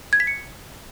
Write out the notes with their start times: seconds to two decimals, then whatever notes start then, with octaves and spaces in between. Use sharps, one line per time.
0.13 G#6
0.20 B6
0.27 C#7